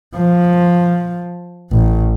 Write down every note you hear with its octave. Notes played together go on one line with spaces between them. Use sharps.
F3
A1